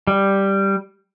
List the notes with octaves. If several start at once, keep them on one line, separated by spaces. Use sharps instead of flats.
G3